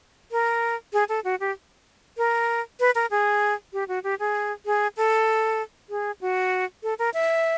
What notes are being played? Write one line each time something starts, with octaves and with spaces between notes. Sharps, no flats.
A#4
G#4
A4
F#4
G4
A#4
B4
A#4
G#4
G4
F#4
G4
G#4
G#4
A4
G#4
F#4
A4
A#4
E5